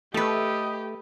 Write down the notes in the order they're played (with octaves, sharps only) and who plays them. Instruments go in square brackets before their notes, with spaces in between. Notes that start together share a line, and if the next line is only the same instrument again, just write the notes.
[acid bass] A3 [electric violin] G4 [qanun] A4 B4 [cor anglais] D#5